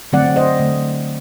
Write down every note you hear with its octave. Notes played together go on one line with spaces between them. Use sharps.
D3 F#3 A3 C4 D5 F#5
C5 D#5
D3 A3